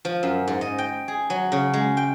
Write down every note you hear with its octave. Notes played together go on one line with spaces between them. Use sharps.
F3
F#2
G#2
D#5
G5
G#4
F#3
C#3
G#3
G5